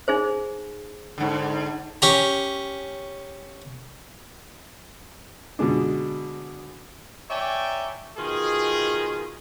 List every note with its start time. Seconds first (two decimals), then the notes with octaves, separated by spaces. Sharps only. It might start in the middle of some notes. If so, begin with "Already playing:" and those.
0.08 D#4 G#4 C5
1.18 G#2 D3
2.02 C#4 G4 A#5
5.59 B2 D3 G#3 D4
7.30 C#5 D5 E5 G5 G#5 A#5
8.17 B2 D#3 F4 G#4